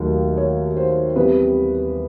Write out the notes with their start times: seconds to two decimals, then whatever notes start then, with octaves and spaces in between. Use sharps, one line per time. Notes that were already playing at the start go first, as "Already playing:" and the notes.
Already playing: D#2 D#3 F#3 A3
0.37 C#5
0.77 C5
1.16 C3 E3 G3 B3 B4